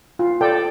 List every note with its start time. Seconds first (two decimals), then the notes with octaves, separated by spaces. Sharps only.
0.19 F4
0.41 A4 D5 G5